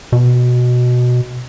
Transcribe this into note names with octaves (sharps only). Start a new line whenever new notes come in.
B2